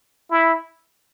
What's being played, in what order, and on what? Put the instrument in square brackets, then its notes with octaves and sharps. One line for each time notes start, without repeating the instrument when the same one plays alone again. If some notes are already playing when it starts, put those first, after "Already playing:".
[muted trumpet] E4